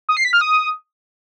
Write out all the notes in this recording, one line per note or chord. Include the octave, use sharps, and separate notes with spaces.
D#6
C7
B6
F6
D#6